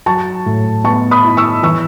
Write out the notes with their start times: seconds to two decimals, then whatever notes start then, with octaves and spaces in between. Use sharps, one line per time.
0.06 F#3 A5 C#6
0.46 A2
0.84 B3 A5 C#6
1.11 B5 D#6
1.24 E4
1.37 C#6 E6
1.63 E3 C#6 E6